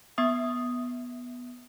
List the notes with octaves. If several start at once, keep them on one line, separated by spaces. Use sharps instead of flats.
B3 E5 D#6